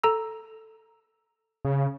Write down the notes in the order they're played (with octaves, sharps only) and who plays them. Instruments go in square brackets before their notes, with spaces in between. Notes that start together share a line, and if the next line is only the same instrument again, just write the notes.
[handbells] A4 A#5 E6
[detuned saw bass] C#3